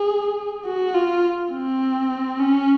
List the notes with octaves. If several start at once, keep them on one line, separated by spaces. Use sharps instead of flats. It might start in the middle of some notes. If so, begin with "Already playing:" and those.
Already playing: G#4
F#4
F4
C4
C#4